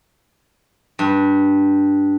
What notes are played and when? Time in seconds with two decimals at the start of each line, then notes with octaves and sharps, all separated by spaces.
0.99 G2